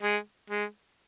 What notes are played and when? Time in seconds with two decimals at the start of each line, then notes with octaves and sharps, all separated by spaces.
0.03 G#3
0.50 G#3